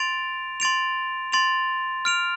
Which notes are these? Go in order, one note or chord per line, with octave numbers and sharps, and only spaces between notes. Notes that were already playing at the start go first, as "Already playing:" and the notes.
Already playing: C6 A6 D7 F7
C6 A6 D7 F7
C6 A6 D7 F7
F6 D7 F7